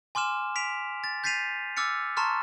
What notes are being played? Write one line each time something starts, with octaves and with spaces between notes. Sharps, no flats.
G#5 C6 D6 F6 E7
B6 D7 F7
A6
G6 A6 B6 C7 D#7 F7
D6 E6 F6 A6 C#7
A5 A#5 C6 C#6 F6 A6